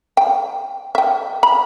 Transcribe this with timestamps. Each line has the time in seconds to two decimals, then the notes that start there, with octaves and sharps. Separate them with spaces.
0.17 G5
0.95 E5 G5
1.43 B5